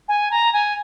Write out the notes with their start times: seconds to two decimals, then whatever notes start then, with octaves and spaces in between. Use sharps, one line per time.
0.08 G#5
0.31 A#5
0.53 G#5